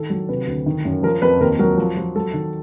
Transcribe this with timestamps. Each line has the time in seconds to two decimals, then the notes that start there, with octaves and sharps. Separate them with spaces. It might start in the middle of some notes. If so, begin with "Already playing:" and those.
Already playing: D#3 A4
0.10 F#3
0.29 C3 B4
0.47 D2
0.66 D#3
0.85 F#2
1.03 F3 A#4
1.22 F2 B4
1.40 D#2 A#4
1.59 F#3 A#4
1.78 F3
1.97 F3
2.16 F#3 A4
2.33 D#3